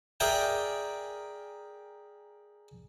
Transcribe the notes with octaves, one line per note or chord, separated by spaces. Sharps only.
G#4 A#4 D5 E5 G5 G#5